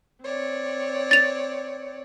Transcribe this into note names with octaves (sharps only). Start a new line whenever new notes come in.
C4 C#5 D5
A6 F7